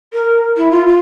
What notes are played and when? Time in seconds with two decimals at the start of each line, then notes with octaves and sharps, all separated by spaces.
0.13 A#4
0.57 E4
0.70 F4
0.86 F4